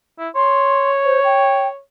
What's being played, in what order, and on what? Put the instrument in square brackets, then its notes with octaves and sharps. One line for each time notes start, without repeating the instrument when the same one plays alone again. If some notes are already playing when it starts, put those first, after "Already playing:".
[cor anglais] E4
[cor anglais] C#5 [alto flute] C6
[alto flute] C5
G5